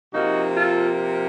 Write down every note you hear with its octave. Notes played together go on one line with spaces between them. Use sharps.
C3 F3 A#3 D#4 F#4
F4 A4